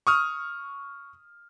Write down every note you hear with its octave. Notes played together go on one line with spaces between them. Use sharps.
C#6 D#6 F6